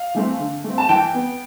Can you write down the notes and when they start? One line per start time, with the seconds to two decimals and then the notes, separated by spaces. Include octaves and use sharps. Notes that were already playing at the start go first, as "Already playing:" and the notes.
Already playing: F5
0.15 E3 A3 C4
0.39 D3
0.64 A3 C4
0.78 A5
0.89 E3 G5
1.14 B3